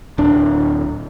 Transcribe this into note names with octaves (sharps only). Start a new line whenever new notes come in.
D1 D4